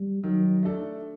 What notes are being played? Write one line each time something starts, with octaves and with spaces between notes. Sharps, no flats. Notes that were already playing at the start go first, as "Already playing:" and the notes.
Already playing: G3
D#3 F#3
A3 D4 A4